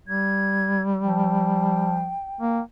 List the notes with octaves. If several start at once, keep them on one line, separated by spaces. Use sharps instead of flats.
G3 G#6
F3 G5
A#3